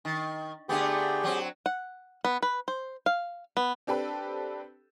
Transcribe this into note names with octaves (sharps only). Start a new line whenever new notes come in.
D#3
D3 A3 B3 G4 G#4 G5
F#3 C4
F#5
B3
B4
C5
F5
B3
C4 D4 G4 A4 B4